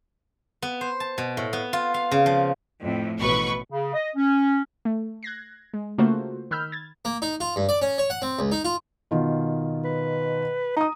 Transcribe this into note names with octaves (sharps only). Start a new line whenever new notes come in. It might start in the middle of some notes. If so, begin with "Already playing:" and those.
B3
C5
A5
B2
A2
B3
F4
F5
C#3
F3
F2 A2
A1 B2 B4 C#6
C#3
D#5
C#4
A3
F#6 G#6 A#6 C7
G#3
C#3 A3 A#3 F4 F#4 C5
D#3 B5 E6 F6 G6
G#6 A6
A#3
D#4
F4
G2
D5
C#4
C#5
F#5
C4
C#2
D#4
F4
B2 D#3 F4
B4
D#4 A#5 D#6